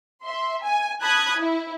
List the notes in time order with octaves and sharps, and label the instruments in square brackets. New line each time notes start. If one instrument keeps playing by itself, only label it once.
[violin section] E5 C6
G#5
A5 B5 D#6 F#6 G#6
E4